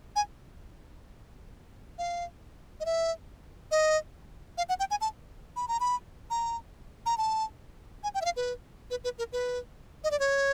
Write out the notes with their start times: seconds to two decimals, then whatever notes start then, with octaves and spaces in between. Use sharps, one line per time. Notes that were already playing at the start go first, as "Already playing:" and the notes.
0.16 G#5
1.98 F5
2.80 D#5
2.85 E5
3.71 D#5
4.58 F5
4.69 F#5
4.79 G5
4.91 G#5
5.01 A5
5.56 B5
5.68 A#5
5.80 B5
6.30 A#5
7.06 A#5
7.18 A5
8.03 G#5
8.14 G5
8.21 E5
8.25 F5
8.36 B4
8.90 B4
9.04 B4
9.18 A#4
9.33 B4
10.04 D#5
10.11 D5
10.19 C#5